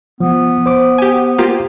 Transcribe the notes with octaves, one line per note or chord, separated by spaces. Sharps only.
F3 B3
C5 D6
G4 G#5
A#3 F4 G4